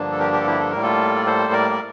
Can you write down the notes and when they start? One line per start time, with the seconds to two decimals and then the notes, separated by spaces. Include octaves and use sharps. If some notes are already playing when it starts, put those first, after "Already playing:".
Already playing: G2 D3 F3 A#3 D4
0.12 A4
0.19 G4 A#4
0.33 G4 A#4
0.41 A4
0.46 E4 G4
0.60 A4
0.71 A2 G3 A#3 A#4
0.82 F4 A4
1.16 D5
1.26 A4 C5
1.52 A#4 D5
1.70 D5